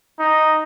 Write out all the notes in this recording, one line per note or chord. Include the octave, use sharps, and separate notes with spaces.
D#4